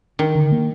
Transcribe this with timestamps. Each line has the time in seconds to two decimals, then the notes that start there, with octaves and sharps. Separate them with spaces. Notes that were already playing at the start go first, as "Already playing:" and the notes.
0.19 D#3 D4
0.35 D3
0.52 A#3